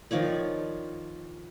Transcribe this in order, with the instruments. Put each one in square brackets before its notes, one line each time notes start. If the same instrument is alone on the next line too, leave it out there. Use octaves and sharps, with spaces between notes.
[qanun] D#3 F3 C#5 D5